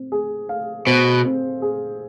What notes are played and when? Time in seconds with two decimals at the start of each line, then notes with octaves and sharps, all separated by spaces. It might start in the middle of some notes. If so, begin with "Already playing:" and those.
Already playing: C4
0.12 G#4
0.49 F5
0.87 B2 C5
1.25 C4
1.62 G#4